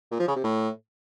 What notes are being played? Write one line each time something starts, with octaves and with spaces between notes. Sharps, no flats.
A#2
F3
C#3
C3
A2